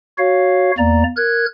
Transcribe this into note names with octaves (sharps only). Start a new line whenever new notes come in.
F#4 C#5 F5
E2 A#3 D5 A#5
A#4 F#6 G#6